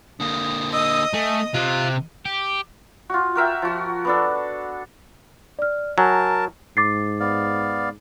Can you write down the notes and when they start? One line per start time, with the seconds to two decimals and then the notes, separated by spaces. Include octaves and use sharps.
0.20 D3 A#3 D#6
0.72 D#5 D#6 E6
1.14 A3 G#5
1.54 C3 F4 F#6
2.25 G4
3.10 F4 F#4
3.35 F#4 A#4 E5 G5
3.62 F3 F#4
4.05 B3 D4 A4
5.59 D5 F6
5.98 F#3 A#4 G#5 A5
6.77 G#2 D6 A6 C7
7.20 B3 D5 F5